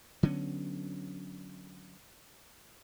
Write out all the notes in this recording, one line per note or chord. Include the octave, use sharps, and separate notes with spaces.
D3 F#3 B3 C#4